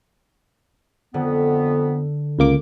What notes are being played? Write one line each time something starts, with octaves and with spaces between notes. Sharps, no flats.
F2 D3 B3
C#2 A#3 D6